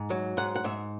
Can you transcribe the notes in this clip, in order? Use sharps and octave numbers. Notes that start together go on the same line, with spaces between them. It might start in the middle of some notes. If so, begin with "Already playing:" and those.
Already playing: G#2
F#3
G#2 F#5
F#5
G#2 E5